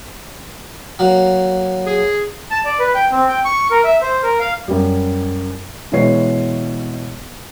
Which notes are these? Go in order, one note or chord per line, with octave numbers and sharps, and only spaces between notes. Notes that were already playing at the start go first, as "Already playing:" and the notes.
F#3 A#3
G#4
A5
D5
B4
G5
C4
G5
C#6
A#4
E5
C5
A#4
F5
F#2 G3
B2 E3 G#3 C#5 C7